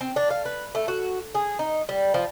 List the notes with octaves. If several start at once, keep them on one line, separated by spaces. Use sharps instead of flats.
C4
D4
F5
B4
A3
F#4
G#4
D#4
G3
F3